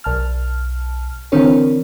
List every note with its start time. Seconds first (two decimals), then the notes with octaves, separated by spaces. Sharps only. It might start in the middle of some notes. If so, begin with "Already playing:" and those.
0.04 B1 A5 F6
1.32 D3 E3 C4 D4 A#4 C#5